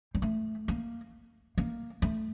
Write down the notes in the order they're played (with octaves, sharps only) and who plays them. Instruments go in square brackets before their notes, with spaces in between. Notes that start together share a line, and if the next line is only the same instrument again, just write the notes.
[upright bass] G3
A3
A#3
A#3
A3